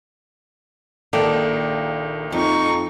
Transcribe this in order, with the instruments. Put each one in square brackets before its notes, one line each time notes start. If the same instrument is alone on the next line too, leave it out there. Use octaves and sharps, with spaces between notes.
[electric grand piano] A#1 A#3 G5 [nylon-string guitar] D#3 A4 D5
[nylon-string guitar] F2 [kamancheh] D#4 C#6